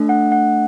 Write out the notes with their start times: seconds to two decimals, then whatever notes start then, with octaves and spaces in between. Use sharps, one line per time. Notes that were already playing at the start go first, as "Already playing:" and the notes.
Already playing: A3 D4 A4
0.09 F#5
0.32 F#5